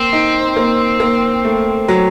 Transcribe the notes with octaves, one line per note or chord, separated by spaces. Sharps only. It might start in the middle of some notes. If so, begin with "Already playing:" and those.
Already playing: A#3 C4
D#4
A#3
A#3
A3
F#3